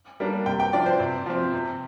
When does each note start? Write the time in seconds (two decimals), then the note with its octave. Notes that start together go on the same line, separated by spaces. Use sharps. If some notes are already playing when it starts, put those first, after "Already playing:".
0.20 G3 A#3 D4
0.46 C3 G5
0.60 G5
0.73 F3 D4 D5
0.86 C5
1.00 C3
1.26 F3 C4
1.53 C3